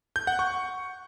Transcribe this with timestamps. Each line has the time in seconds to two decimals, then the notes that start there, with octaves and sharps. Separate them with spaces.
0.16 G6
0.27 F#5
0.39 C#6